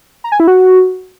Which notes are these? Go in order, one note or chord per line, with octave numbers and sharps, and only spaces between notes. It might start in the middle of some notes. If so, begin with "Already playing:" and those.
A#5
G#5
E4
F#4